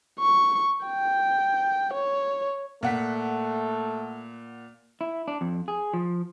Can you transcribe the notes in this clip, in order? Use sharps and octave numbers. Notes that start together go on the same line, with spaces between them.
C#6
G5
C#5
A#2 A3 F#5 B6
E4
D4
F2
G#4
F3